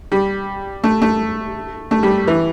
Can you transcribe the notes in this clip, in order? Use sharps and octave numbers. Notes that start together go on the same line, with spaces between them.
G3
A3
A3
A3
G3
E3